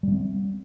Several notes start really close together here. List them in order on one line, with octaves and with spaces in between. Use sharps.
G3 C#4 C4